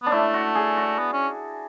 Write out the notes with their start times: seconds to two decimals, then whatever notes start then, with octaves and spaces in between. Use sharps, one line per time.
0.03 B3 D4
0.12 A3 E4
0.34 F#4
0.55 G#4
0.77 F#4
0.99 B3
1.13 C#4